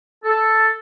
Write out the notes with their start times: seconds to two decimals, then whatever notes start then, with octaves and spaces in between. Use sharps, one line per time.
0.24 A4